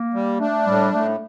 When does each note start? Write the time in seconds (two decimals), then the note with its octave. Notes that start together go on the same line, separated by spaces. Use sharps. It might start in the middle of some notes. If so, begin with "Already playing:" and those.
Already playing: A#3
0.14 G3
0.40 A3 D4
0.67 A2 G3
0.94 A2 A3